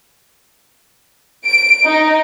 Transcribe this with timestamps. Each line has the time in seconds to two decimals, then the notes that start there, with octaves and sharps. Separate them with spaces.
1.45 D7
1.85 D#4